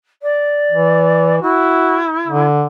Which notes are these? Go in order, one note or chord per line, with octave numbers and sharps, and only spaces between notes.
D5
E3
E4 F#4
D3